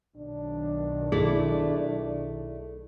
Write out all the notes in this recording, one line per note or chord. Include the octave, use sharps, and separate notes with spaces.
B1 D#3 D4
A3 E4 G#4 D5